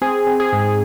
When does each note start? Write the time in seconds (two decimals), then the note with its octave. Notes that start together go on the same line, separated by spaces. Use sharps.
0.01 C4 G#4
0.27 C4
0.40 G#4
0.52 G#2